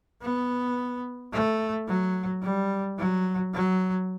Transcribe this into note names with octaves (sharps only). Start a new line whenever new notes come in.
B3
A3
F#3
G3
F#3
F#3